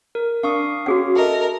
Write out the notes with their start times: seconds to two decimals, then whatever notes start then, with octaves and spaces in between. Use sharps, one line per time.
0.15 A#4
0.43 D4 F5 C#6 D#6
0.86 C#4 F#4 G#4 F#5
1.16 A4 A#4 D#5 E5